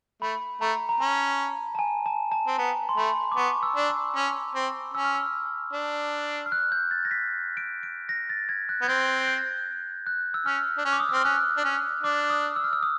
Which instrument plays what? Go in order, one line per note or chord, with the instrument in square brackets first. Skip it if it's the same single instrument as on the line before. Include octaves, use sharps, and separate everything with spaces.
[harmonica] A3 [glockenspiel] B5
[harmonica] A3 [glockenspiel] A#5
[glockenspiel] A#5
[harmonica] C#4 [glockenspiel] A5
[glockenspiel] A5
G#5
A5
A5
[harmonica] C4
[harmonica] B3 [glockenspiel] A#5
[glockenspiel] C6
[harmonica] A3 [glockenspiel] B5
[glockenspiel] D6
[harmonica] B3 [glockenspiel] C#6
[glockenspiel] E6
[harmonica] D4
[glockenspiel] D6
[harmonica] C#4
C4
[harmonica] C#4 [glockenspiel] E6
[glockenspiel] F6
E6
[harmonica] D4
[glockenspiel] F6
F#6
G6
A6
A#6
B6
D7
D7
A#6
A6
G#6
F#6
[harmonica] B3 [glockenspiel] G#6
[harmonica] C4 [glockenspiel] G6
[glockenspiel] G6
F#6
E6
[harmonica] C#4 [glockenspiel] F6
[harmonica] D4
C#4
[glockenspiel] D6
D#6
E6
[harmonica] C4 [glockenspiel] F6
[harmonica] C#4 [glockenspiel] F#6
[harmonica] D4
C#4
[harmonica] D4 [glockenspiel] D6
[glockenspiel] D#6
E6
F6
E6
D#6